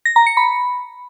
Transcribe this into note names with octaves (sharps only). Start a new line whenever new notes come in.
A#6
A#5
C#7
B5